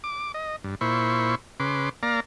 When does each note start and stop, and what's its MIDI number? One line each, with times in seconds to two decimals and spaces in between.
0.04 0.32 86
0.34 0.56 75
0.64 0.75 43
0.81 1.35 46
0.81 1.35 64
0.81 1.35 72
0.81 1.35 83
0.81 1.35 85
1.60 1.89 49
1.60 1.89 71
1.60 1.89 84
1.60 1.89 86
2.03 2.20 58
2.03 2.20 74
2.03 2.20 77
2.03 2.20 82